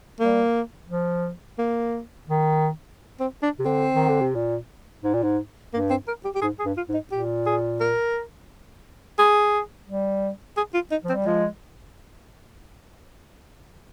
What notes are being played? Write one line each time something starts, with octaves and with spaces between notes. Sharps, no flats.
G3 A#3
F3
A#3
D#3
C4
D4
C3
D3 C4
D#3
D3
C3
A#2
G#2
A#2
G#2
G2 A#3
C4
A#4
G4
G4
G#2 G#4
G#4
G2
F4
G#2
D#4
A#2 G4
G#4
A#4
G#4
G3
G#4
F4
D#4
F3
C4
G3
F3 G#3